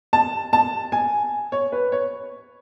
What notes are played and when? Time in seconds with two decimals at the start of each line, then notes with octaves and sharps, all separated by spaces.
0.13 A5
0.53 A5
0.92 G#5
1.52 C#5
1.72 B4
1.92 C#5